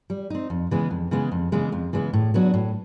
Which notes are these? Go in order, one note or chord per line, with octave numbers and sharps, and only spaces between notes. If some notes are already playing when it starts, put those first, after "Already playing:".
G3
C4 D#4
F2
C#3 E3 G#3 B3
F2
C#3 E3 G#3 B3
F2
C#3 E3 G#3 B3
F2
C#3 E3 G#3 B3
A2
F#3 B3 D4 F#4
A2